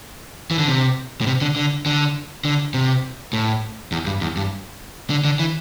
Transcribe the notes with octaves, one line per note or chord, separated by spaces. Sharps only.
E3
D3
C3
A2
C3
D3
D3
D3
D3
C3
A2
E2
G2
E2
G2
D3
D3
E3